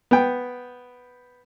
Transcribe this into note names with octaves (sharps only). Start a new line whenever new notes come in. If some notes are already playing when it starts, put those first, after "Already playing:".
B3 G5